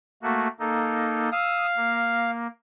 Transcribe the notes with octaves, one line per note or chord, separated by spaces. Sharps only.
A3 A#3 F#4
A#3 D#4 A4
F5 D#6 E6
A#3